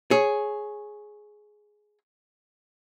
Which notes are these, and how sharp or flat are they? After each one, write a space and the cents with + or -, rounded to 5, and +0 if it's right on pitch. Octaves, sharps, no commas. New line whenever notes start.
G#4 +10 C#5 -10